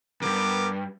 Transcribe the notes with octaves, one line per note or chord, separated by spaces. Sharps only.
E2 G2 B3 A#4 D6